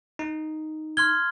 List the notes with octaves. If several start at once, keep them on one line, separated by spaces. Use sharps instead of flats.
D#4
C6 F6 G#6 G7